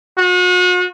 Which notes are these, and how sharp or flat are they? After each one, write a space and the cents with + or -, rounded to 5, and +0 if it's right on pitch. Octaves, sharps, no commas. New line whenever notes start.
F#4 -40